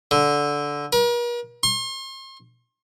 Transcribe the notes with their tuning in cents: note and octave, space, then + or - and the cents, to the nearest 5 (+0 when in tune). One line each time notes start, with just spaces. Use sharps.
D3 -10
A#4 +45
C6 +40